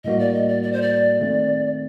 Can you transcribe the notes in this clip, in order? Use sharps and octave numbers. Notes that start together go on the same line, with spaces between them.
A2 G3 A#3 F#4 D#5
D5
D#5
D5
D5
C5
D5
D#3 A3 C4